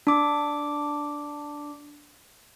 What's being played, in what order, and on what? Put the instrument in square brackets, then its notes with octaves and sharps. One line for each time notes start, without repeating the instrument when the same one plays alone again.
[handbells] D4 D6